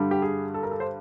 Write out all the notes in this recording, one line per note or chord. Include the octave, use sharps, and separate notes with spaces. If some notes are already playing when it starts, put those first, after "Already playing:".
Already playing: G2 D3 G3
G4
G#4
A4
A#4
A4
C5